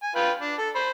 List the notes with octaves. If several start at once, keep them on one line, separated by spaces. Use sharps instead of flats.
G#5
F4 B4 G5
D4
A4
C5 B5